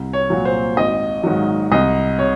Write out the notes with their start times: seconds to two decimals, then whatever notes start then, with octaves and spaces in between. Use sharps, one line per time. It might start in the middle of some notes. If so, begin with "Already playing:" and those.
Already playing: C2
0.13 C#5
0.30 A#2 F#3
0.45 C5
0.77 G#1 D#5
1.24 G#2 D#3 F#3
1.72 C2 D#5
2.19 C3 C#5